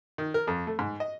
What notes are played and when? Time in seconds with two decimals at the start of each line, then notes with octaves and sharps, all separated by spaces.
0.18 D#3
0.34 A#4
0.47 F2
0.67 A3
0.79 G#2
1.00 D#5